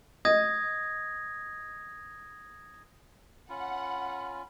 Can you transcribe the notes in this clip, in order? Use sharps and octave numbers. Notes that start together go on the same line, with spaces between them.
D#5 D#6 G#6 A#6
C#4 F4 F#5 B5